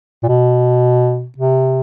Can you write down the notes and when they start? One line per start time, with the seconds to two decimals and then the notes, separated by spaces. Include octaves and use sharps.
0.23 A#2
0.29 B2
1.38 C3